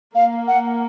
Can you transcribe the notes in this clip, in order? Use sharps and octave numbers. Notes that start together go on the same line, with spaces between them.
A#3 F5
F#5